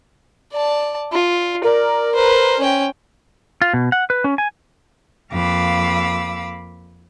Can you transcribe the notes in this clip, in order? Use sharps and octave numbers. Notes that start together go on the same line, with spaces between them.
D5 A5
F4
A#4 D5
B4 C5
C#4 G5
F4
B2
F#5
B4
C#4
G#5
F2 A#3 F5 B5 D6 E6